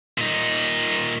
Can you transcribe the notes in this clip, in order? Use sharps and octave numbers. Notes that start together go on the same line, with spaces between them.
A#2 D#4